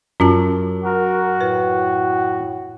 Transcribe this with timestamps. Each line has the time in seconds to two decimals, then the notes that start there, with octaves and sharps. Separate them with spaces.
0.20 F#2 C#4 F4 A5
0.84 F#4 A#4
1.41 A2 B4